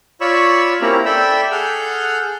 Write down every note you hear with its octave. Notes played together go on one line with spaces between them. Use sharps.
F4 C#5 D5 B5 C#6 E6
A#3 C4 C#4 E4 G4 A#5
A4 D5 E5 G5 B5 E6
G#4 A4 F#5 F6 G6